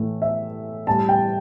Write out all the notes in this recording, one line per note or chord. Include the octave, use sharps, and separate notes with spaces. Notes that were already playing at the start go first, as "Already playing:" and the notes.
Already playing: A2 E3 A3
E5
A2 G3 A5
G5